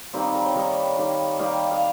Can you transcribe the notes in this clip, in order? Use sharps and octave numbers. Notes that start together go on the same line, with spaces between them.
D#3 G3 A#3 C4
D#4
A#4
C#5
D#3 G3 A#3 D#5
D#3 G3 A#3
D#3 G3 A#3 F5
F5